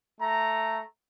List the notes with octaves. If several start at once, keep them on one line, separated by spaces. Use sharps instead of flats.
A3 A#5